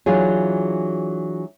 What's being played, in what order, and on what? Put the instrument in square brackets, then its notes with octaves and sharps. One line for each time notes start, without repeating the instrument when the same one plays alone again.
[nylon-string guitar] E3 F#3 D4 F4 G#4